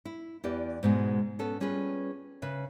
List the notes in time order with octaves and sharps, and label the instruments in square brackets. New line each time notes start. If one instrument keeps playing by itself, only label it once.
[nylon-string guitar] E4
E2 E3 G4 D5
G#2 B2 G#3
B3 C#4 A4
G3 C#4 F4 G#4 B4
C#3 B4 E5